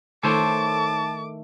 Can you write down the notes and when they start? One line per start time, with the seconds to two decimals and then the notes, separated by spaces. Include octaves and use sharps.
0.24 D#3 A3 A4 C5 C#5 A5 D6